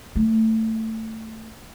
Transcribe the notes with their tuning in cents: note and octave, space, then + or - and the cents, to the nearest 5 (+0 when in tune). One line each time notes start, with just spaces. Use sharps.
A3 +15